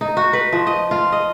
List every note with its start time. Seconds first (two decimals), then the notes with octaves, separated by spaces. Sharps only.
0.01 D#4
0.17 F#4
0.33 B4
0.52 F3
0.67 D#5
0.91 F4
1.12 D#5